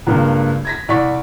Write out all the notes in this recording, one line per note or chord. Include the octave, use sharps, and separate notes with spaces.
C#2 G2 A#3
G#6 A#6 B6
C2 D5 C#6 B6